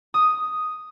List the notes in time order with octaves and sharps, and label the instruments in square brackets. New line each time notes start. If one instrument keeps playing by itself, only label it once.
[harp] D#6